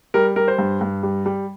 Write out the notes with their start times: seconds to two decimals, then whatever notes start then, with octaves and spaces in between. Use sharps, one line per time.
0.14 G3 A#4
0.36 G3 A#4
0.48 C5
0.58 G2
0.81 G2
1.03 G3
1.26 G3